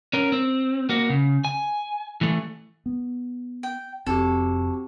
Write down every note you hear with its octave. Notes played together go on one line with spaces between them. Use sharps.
C#4 A#4
C4
A#3 F#4
C#3
G#5
E3 A3
B3
G5
F1 C4 F#4 G4 A4